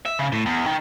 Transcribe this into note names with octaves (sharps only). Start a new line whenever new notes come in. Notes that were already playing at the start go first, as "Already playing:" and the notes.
E5
C#3
A2
E2
D#3